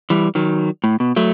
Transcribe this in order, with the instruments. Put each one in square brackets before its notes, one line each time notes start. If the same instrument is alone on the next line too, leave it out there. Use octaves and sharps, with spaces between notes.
[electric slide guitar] E3 G3
D#3 F#3
A2
B2
F#3 A3